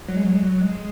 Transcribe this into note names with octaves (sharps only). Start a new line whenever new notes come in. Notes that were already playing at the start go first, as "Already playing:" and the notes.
F#3
G#3
F#3
G#3
F#3
G#3